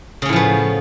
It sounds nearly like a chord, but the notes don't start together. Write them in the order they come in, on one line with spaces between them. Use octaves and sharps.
C#3 C#4 A2 F3 B3